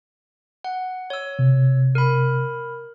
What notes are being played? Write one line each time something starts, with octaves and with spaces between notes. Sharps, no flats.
F#5
C#5 E6
C3
A#4 B5